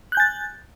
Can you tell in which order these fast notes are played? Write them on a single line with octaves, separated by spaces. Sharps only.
F#6 G6 G#5 A6